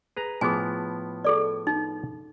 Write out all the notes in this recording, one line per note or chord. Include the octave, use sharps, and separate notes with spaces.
G#4 B4 A#5
A2 F3 B3 G#4 G#5
G#4 A4 D5
D#4